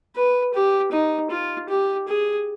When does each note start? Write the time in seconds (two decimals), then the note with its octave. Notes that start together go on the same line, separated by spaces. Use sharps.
0.16 B4
0.54 G4
0.92 D#4
1.31 F4
1.69 G4
2.08 G#4